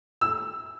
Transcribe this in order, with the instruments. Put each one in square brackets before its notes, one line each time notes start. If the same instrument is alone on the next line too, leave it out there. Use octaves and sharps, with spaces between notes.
[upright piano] E6